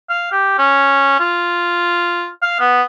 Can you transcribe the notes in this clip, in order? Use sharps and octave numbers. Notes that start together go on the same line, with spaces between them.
F5
G4
C#4
F4
F5
B3